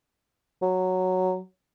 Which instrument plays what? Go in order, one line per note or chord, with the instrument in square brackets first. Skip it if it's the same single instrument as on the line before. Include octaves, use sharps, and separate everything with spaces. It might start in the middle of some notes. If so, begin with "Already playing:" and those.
[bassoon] F#3